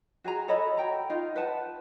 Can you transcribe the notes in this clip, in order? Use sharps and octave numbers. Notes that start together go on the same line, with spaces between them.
F#4 G#4 G#5 A#5
A4 C#5 D#5 B5
F#4 G5 A#5
D#4 F4
B4 F#5 A5